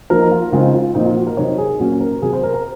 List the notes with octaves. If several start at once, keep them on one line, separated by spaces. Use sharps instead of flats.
F3 A#3 D#4 A#4
F4
C#3 G#3 C4 D#4 F4
F4
A#2 F3 C4 D#4
F4
F#4
A#4
C3 F#3 C4 D#4 C#5
G#4
A#2 F#3 A#3 C#4 F#4
A#4
C3 F#3 C4 G#4
C5
A#4
A#4